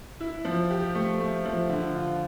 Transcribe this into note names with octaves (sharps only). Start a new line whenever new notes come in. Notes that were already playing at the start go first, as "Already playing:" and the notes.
E4
F3
G4
A3
A3
F3
D3
F4